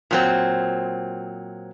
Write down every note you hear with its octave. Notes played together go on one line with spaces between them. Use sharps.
A#2 F#3 C4